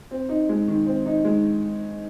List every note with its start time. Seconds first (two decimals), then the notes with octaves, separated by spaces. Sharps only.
0.11 C4
0.29 D#4
0.49 G#3
0.68 D#3
0.86 C4
1.06 D#4
1.25 G#3